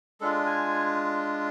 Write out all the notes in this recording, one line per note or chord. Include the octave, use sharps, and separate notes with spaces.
G#3 D4 F4 A4
G#5